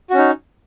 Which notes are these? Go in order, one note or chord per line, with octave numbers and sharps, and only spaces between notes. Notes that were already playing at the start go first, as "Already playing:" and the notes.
C#4 D#4 F#4